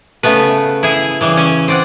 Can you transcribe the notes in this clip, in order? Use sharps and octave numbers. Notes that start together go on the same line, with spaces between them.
C#3 A3 B3 B4
E4 G#4
C#3 E3 G3
C#4
C4 D5 F#5